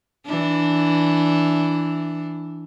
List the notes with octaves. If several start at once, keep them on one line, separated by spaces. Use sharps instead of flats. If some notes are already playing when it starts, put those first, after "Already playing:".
E3 D4